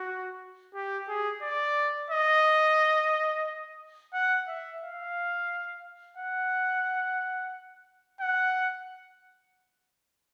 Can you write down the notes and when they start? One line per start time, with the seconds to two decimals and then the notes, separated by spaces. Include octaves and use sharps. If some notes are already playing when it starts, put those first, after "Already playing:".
Already playing: F#4
0.75 G4
1.09 G#4
1.42 D5
2.11 D#5
4.14 F#5
4.48 E5
4.82 F5
6.17 F#5
8.21 F#5